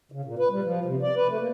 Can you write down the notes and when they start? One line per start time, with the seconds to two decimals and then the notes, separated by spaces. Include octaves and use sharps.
0.12 C#3
0.25 A#2
0.39 B4
0.51 G3
0.64 F3
0.85 C3
1.02 D5
1.16 B4
1.28 A3
1.40 A#3